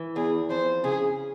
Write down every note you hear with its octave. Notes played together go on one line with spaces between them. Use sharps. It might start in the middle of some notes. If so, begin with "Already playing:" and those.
Already playing: E3
E2 G#4
F2 C5
C#3 G#4